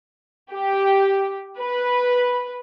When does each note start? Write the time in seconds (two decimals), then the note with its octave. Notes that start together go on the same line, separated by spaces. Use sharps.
0.52 G4
1.58 B4